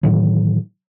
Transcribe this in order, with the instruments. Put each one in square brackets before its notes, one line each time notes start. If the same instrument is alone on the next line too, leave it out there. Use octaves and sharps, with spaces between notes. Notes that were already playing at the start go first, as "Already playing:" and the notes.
[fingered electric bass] A2 D#3 E3 F#3